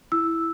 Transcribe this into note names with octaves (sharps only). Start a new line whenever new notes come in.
E4 E6